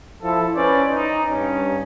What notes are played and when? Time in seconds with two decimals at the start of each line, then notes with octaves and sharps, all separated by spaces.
0.23 F3 E4 A4
0.55 C#4 B4 C5 D5
0.88 D#4
1.30 G2 C#4